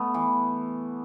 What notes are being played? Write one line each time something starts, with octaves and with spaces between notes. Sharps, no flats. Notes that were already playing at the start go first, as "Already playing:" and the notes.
Already playing: A3 B3
E3